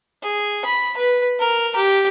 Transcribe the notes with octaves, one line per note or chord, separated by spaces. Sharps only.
G#4
B5
B4
A#4
G4